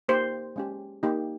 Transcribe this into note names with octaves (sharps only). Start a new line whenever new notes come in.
A#3 D#4 G4 C5
G#3 C#4 G4
A#3 D#4 G4